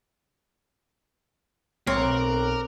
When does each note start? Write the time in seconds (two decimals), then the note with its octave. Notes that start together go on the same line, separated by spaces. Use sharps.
1.87 B1 C4 A#4 C#5 D6 F#6